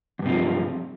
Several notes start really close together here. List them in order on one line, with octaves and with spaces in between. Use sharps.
E2 G2 C3 F3